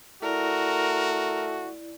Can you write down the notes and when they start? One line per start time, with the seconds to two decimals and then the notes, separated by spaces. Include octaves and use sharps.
0.22 A3 E4 F#4 A#4 D5